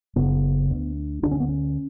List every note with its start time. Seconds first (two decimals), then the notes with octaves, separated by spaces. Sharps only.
0.16 F#1 F#2 C#3 B3
0.70 D2 D3
1.22 D2 D3 D4
1.31 C#4
1.40 B3
1.49 C#4